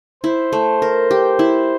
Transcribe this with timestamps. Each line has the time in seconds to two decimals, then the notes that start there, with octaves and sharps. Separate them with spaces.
0.23 E4 C5
0.53 A3
0.82 A#4
1.11 G4
1.39 E4